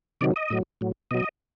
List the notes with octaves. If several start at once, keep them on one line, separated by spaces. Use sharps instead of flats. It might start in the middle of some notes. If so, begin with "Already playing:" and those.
C3 D#3 F#3 D5
D#5
A2 F#3
A2 F#3
B2 F#3 D#5